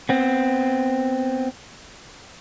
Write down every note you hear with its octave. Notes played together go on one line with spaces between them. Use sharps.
B3 C4